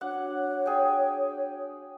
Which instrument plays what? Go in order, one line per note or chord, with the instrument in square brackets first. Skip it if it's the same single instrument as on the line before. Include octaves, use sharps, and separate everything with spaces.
[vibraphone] D4 F#4 [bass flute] C#5 [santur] F#5
[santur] G#4 G5